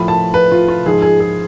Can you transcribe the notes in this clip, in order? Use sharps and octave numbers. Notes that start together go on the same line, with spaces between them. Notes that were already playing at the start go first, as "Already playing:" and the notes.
Already playing: A2 F3 B5
A5
B4
F4
F4
G#2 F3 G#4
G#4
G#4